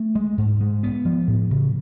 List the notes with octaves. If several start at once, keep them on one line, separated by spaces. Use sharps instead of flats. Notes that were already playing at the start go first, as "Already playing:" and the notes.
Already playing: A3
G#3
G#2
G#3
B3
F3
A2
C#3